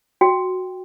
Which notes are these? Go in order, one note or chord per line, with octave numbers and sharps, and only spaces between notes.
F#4 G5